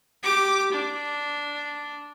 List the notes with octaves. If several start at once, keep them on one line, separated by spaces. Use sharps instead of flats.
G4 D6
D4